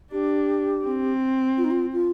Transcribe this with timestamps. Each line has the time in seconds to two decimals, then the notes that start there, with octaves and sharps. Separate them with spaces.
0.12 D4 G4
0.84 C4
1.57 F4
1.64 D#4
1.70 F4
1.92 F4